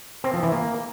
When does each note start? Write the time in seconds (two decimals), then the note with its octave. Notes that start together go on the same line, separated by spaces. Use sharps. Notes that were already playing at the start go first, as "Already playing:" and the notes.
0.24 C4
0.33 F3
0.43 E3
0.52 A#3